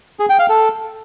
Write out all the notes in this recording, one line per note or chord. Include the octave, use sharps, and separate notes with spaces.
G#4
G5
F5
A4